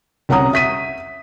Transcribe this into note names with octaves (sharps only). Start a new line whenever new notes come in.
C2 C#4 F#5 A#5 D#6
E5 B6 D#7